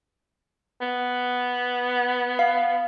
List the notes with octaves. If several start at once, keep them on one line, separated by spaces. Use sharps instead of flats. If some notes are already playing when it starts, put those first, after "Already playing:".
B3
F5